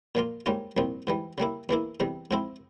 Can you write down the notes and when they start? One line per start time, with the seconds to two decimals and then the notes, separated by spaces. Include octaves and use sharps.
0.15 A#2 F3 A#3 F4
0.46 G#2 G3 A#3 C#4 F4
0.77 C2 A#2 F3 C4
1.07 G#2 E3 G3
1.38 C#3 G3 A#3 E4
1.69 E2 E3 A#3 E4
2.00 E2 C3 G3
2.31 G#2 F3 C4 E4